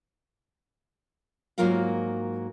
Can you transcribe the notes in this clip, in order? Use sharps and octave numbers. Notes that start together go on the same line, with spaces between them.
G#2 F#3 A#3 F4 A#4 F5